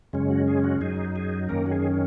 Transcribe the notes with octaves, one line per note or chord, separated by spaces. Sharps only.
F#2 C#3 G#3 C#4
F#4
G#4
F#4
F#2 F#3 D#4 G#4
G#4
F#2 D#3 A#3 C#4 A#4
F#4
G#4